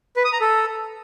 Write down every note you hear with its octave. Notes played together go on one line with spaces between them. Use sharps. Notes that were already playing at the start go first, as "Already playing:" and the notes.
B4
D#6
A#5
A4